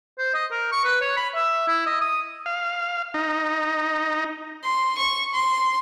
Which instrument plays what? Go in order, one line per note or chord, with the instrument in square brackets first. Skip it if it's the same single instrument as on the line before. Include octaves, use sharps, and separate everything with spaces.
[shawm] C5
D#5
A#4
C#6
B4
C#5
B5
E5
E4
D#5
D#6
[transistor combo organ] F5
D#4
[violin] C6
C#6
C6